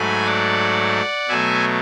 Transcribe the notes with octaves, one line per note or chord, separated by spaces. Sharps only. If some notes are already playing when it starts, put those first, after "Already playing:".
Already playing: G#2 F#3 A3 G#5 B5
D5 F#5
B2 F#3 A3 E5 G#5